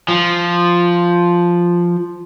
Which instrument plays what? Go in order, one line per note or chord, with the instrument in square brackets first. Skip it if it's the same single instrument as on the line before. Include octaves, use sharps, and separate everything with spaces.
[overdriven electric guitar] F3